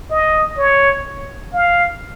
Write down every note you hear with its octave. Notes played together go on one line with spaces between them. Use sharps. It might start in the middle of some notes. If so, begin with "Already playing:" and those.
D#5
C#5
F5